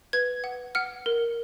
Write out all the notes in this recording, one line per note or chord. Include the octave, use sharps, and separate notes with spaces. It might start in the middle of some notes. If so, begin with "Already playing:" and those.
B4 G#6
F#5
F#5 F6
A#4